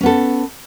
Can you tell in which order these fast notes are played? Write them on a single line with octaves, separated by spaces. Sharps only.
C#4 B3 A4